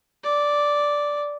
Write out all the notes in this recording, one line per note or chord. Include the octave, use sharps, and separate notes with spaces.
D5